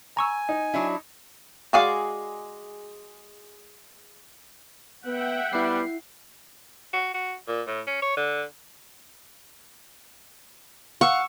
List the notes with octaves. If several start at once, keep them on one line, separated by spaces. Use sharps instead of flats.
G#5 A#5 C#6 E6
D#4
F#3 D4 E4
G#3 F#4 G#4 D5 F5
B3 E5 F#5 G5
G3 B3 E4 C7
F#4
F#4
A#2
A2
C#4
C#5
D3
F5 F#5 C#6 E6